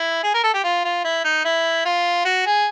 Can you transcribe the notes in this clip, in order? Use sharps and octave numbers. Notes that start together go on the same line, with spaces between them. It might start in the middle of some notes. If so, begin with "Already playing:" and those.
Already playing: E4
G#4
A#4
A4
G4
F4
F4
E4
D#4
E4
F4
F#4
G#4